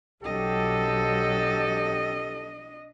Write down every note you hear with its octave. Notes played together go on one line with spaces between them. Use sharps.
B1 F#3 D4 G4 A4 D#5